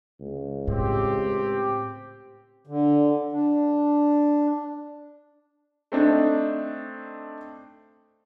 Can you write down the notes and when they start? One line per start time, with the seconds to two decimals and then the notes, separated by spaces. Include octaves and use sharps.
0.20 C#2
0.68 A2 C4 G4
2.67 D3
3.32 D4
5.92 A3 C4 D4 D#4